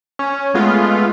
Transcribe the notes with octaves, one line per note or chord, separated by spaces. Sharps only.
C#4
G#3 A3 B3 F4